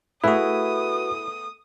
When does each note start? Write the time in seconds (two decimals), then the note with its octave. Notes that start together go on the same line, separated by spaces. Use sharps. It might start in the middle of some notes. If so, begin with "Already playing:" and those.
0.24 A3 B3 E4 F#4 G#4 B4 D#6